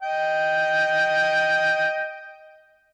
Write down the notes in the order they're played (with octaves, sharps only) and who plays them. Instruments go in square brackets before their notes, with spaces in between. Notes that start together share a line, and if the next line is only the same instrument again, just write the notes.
[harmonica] D#5 G5